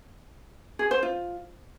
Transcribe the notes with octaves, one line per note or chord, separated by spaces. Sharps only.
G#4
C5
F4